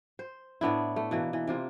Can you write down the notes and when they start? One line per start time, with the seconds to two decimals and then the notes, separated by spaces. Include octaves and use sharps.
0.19 C5
0.61 A2 B3 D4 E4
0.96 A3
1.11 B2 E3 A#3
1.33 E3
1.47 C3 A#3 F4